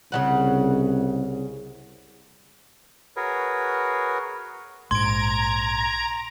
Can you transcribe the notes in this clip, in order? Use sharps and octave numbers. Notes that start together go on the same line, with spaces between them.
C2 C#3 F#3 F#5
F#4 G#4 A#4 B4 C#5
A#1 G#2 A#5 C6 G#6 D7